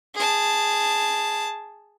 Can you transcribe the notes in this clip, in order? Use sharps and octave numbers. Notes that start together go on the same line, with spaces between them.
G#4 A5